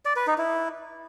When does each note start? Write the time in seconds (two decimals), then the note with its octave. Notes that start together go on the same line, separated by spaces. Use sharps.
0.05 D5
0.16 B4
0.27 D#4
0.38 E4